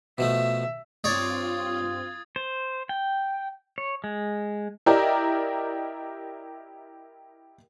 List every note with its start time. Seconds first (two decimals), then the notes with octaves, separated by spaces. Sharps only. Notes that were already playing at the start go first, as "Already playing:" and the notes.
0.18 B2 F3 A3 E5
1.04 G2 C4 F4 C#5 D5 D#6 G#6 A6
2.36 C5
2.89 G5
3.78 C#5
4.04 G#3
4.86 E4 G4 A#4 D5 D#5